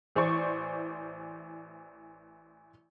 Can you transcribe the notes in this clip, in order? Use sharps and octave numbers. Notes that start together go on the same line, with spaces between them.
A1 E3 C5 D5 C#6